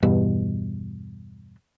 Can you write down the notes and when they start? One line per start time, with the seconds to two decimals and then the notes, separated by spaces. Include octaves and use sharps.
0.02 E2 G2 B2